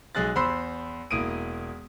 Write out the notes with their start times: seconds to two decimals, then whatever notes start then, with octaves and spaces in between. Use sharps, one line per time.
0.15 B1 G#3 G#4 F#6 A6
0.35 E2 C5 B5 C6 E6 C7
1.11 E1 A#3 E4 D#6 D7 D#7